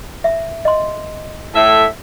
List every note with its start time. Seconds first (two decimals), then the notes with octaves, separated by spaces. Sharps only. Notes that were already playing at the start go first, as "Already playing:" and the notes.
0.24 E5
0.65 D#5 C6
1.55 A2 E5